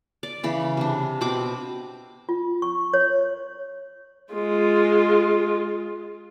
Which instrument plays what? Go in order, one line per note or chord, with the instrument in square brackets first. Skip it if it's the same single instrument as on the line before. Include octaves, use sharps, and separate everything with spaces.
[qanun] D5
C#3 E3 B5
C3 D4
B2 C4 B5 D6
[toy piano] F4
C#6
C#5
[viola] G#3 F4